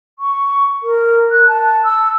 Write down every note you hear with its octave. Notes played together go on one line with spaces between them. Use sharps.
C#6
A#4
F#6
A5
E6